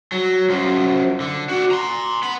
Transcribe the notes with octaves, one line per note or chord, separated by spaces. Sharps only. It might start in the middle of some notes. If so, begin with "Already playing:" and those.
F#3
F#2 F3
D3
F#4 D5
A#5 C6
B3 B5